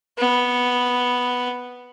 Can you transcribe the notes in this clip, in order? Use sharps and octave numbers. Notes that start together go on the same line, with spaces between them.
B3